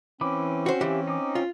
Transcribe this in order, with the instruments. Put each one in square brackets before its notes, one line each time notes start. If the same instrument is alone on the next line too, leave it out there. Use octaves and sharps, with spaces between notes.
[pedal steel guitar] E3 B5 D6 [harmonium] C4 C#4
[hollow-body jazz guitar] F#4 C5
[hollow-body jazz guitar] E3 [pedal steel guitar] G4 E5 F5
[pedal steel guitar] D#4 D6
[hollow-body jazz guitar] F4